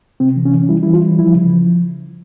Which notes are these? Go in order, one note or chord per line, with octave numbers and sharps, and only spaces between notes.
C3 C4
E3
C#4
E3
G3 E4
E3 E4
F4
G3
F3 E4
C#3
F3